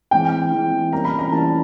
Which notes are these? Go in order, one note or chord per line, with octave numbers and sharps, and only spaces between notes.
E3 G#3 C4 G5
E3 G#3 C4
E3 G3 A#3 C#4 A#5
B5
A#5
E3 G3 A#3 C#4 A5